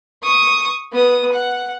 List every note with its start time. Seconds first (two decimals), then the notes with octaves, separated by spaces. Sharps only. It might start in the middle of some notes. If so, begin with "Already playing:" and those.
0.23 C#6 D#6
0.92 B3 D#6
1.32 F#5